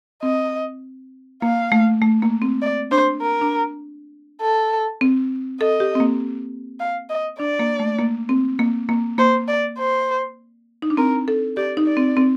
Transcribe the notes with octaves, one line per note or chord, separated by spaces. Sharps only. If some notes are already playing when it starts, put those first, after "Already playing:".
C4 D#5
A#3 F5
A3
A3
A#3
C4
D5
D4 C5
A#4
D4
A4
C4
A4 D#5
G4
C4
A#3
F5
D#5
D4 D5
A#3
A3
A#3
C4
A#3
A#3
A#3 C5
D5
C5
D#4
D4
C4 A#4
A4
G4 D5
D#4
D5
C4
C4